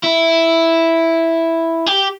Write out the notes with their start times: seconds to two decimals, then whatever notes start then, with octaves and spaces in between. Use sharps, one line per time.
0.04 E4
1.86 G4